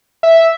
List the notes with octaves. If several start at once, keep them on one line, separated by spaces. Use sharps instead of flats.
E5